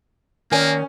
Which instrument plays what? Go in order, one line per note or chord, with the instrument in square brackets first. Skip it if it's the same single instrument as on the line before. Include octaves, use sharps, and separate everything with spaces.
[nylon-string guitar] D#3 D5 G#5 [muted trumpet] A#3 [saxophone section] C#4